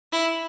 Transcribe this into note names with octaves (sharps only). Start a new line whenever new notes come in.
E4